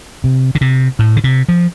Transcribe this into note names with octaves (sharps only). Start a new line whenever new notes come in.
C3
D3
C3
A2
D3
C3
F3